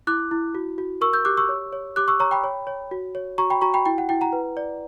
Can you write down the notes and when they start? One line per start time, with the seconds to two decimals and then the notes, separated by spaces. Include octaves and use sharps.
0.07 E4 D6 F#6
0.31 E4
0.55 F#4
0.78 F#4
1.01 A#4 C#6 E6
1.13 E6 G6
1.25 G4 D6 F#6
1.37 C#6 E6
1.49 C#5
1.73 C#5
1.96 G4 D6 F#6
2.08 C#6 E6
2.20 C#5 A#5 C#6
2.31 G5 B5
2.44 C#5
2.67 C#5
2.91 F#4
3.15 C#5
3.38 F#4 A#5 C#6
3.50 G5 B5
3.61 F#4 A#5 C#6
3.74 G5 B5
3.86 E4 G5
3.98 F#5
4.09 E4 G5
4.21 F#5 A#5
4.33 B4
4.57 D5